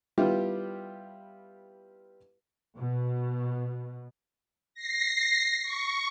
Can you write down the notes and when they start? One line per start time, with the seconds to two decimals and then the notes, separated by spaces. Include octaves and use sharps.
0.18 G3 B3 E4 F4 G4
2.77 B2
4.74 A#6 C7
5.63 C#6